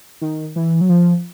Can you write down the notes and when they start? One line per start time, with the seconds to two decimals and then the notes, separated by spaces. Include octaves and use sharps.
0.21 D#3
0.56 E3
0.81 F#3
0.89 F3